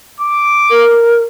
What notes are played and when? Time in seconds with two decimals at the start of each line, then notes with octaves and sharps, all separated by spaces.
0.20 D6
0.70 A#4